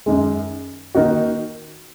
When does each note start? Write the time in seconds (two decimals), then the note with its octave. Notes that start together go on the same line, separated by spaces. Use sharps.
0.06 F#2 D#3 G#3
0.95 D#3 A#3 D#4 F#4